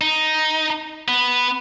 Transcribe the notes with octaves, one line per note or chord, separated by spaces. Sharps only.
D#4
B3